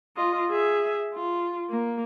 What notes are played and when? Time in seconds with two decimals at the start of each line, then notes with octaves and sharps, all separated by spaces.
0.16 F4 D#5
0.49 G#4 E5
1.13 F4
1.70 A#3